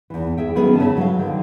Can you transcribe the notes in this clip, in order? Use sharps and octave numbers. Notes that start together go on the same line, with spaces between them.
E2 E3
G#4 E5 G5
D#3 F#3 B3 C#4 G#4 A4
C#3 E5 A5
F#3 F5
D3 D#3